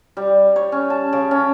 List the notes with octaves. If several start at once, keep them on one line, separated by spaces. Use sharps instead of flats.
G3
C#5
C#4
A5
C#3
C#4